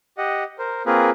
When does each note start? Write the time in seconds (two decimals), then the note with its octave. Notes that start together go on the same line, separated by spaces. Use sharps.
0.18 G4 D#5 F#5
0.59 A#4 C5
0.86 A#3 C4 F4 G#4 A#4 B4